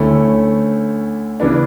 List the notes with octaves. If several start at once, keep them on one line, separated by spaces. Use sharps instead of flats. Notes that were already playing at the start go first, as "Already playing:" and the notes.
Already playing: D2 D3 A3 C#4 E4
C#3 E3 B3 D4